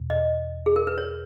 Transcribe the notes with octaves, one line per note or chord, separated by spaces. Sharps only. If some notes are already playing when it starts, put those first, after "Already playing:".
Already playing: E2 B2
D#5
G#4
A#4
B4
C#5